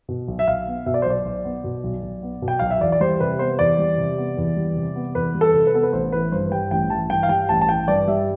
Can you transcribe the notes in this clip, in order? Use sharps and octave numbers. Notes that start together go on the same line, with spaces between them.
B2
B1
E5
B1 F5
B3
B2 E5
D5
C5
B1 D5
B1
B3
B2
B1
B1
B3
B2
G5
B1 F5
E5
E2 D5
D5
G3 C5
C3 B4
B3 C5
E2 D5
G3
C3
B3
E2
G3
C3
B3
E2 B4
G3
A4
C3
B4
B3 A4
B4
A1 C5
E3 B4
G2 C5
G3 G5
A1 G5
E3 A5
G2 G5
F5
G3 G5
A1 A5
A5
E3 G5
G2 D5
G3 E5